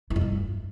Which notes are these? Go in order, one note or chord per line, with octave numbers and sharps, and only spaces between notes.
E3
F2
G2